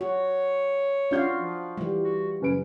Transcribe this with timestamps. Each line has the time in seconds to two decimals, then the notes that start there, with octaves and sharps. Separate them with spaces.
0.01 F#4 C#5
1.11 D4 F4 F#4 F5 G6
1.36 F3
1.77 E3 G3
2.04 F#4
2.41 F#1 C#4 B4 D7